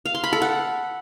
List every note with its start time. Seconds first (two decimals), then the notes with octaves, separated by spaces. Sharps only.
0.06 F5
0.15 C6
0.24 B5
0.33 A4
0.42 F#5